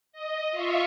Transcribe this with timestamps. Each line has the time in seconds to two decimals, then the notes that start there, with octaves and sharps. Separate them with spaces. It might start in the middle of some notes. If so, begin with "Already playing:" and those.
0.12 D#5
0.51 F4 E5 F5 C#6